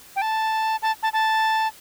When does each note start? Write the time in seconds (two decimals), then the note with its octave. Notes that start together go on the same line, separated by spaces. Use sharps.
0.16 G5
0.22 A5
0.82 A5
1.03 A5
1.13 A5